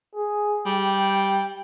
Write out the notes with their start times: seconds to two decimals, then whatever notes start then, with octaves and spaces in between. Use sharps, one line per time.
0.15 G#4
0.66 G3 G5